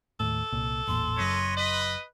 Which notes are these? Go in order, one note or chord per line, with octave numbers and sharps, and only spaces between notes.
D#2 A2 A4
C2 A#2
A1 E2 A#2 C6
F#1 F#2 B4 C#5 D#5
B4 D#5